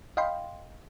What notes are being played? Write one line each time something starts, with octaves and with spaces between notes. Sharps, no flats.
D#5 F5 G5 B5 C6